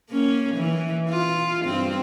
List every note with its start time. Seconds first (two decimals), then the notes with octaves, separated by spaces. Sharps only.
0.10 A#3 C#4
0.55 E3
1.10 F4
1.65 G2 C4